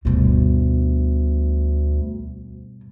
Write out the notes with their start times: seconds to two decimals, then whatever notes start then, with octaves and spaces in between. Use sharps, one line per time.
0.05 D2 G2 B2